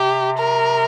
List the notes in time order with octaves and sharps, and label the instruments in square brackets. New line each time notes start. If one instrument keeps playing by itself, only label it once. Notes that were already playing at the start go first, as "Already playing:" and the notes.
Already playing: [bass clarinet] C3 [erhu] G4
[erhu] A#4